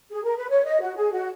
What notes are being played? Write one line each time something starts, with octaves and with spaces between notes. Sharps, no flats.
G#4
A#4
B4
C#5
D#5
F#4
G#4
F#4